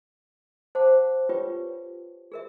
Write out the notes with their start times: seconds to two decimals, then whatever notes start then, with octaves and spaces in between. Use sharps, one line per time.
0.75 C5 F#5 A5 D6
1.29 F4 G4 B4 C#5 G5
2.32 G#4 A#4 E5